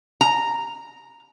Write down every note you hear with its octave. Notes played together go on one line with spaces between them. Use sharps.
A#5